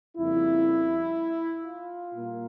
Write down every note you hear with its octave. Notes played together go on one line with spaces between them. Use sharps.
F2 C#3 G3 A#3 E4
F4
A#2 G3 A#3